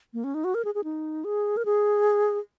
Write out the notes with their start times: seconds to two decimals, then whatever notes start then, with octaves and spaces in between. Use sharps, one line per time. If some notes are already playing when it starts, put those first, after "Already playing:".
0.14 A#3
0.24 C#4
0.34 D#4
0.44 F#4
0.55 A#4
0.65 G#4
0.75 G#4
0.84 D#4
1.24 G#4
1.57 A#4
1.65 G#4